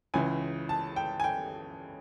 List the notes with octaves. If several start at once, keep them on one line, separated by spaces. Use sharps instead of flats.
C#2 C#3 E3 G#5
A5
G5
G#5
G5